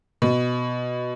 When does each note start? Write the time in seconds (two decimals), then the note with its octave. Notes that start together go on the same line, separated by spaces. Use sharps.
0.22 B2